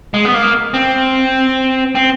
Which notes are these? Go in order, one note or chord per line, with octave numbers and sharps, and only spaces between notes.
G#3
B3
A#3
C4
C4